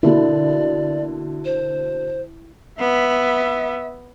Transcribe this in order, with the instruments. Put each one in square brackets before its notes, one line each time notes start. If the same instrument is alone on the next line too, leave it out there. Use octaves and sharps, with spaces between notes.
[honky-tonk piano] B2 D3 A#3 [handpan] E4 [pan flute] D5
[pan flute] C5
[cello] B3 [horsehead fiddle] E5